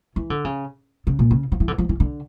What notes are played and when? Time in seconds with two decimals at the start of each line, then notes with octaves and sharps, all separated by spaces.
0.16 E3
0.30 D3
0.45 C#3
1.07 C#3
1.19 A#2
1.31 C#3
1.52 F3
1.60 E3
1.68 D3
1.78 F3
1.89 E3
2.00 D3